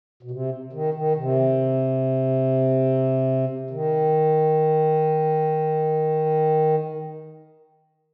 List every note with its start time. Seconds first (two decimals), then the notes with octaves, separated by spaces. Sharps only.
0.23 B2
0.31 C3
0.73 D#3
0.94 D#3
1.16 C3
3.70 D#3